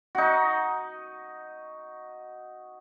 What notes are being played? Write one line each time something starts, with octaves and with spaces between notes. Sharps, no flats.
D#4 F#4